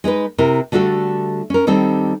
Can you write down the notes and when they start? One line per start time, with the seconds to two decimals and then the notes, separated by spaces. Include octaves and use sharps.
0.04 G#3 D#4 A#4 B4
0.38 C3 E4 A#4
0.72 D3 G3 A3 F#4 A4
1.50 C#4 A#4
1.67 D#3 G3 C4 A4